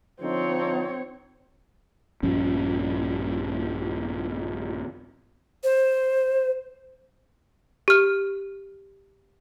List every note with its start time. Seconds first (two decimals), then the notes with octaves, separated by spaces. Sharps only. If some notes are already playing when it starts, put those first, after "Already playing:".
0.22 D3 F3 C4 D#4 C#5
2.23 A#1 G2 F3 C#4
5.64 C5
7.88 G4 F6